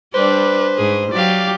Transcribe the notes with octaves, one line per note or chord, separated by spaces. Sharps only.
G3 D4 B4 C5 D5
G#2 G#4
F#3 G4 D5 F5